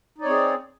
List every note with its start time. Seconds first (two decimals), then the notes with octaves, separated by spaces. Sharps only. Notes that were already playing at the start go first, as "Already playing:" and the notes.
0.18 D#4
0.21 D5
0.24 C#5
0.27 C4
0.30 G#4